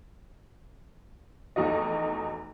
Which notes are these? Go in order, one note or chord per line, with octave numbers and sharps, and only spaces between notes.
F1 E2 D#4 F#4 D#5